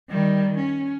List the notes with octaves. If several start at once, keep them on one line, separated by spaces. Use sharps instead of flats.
D#3 G3
C#4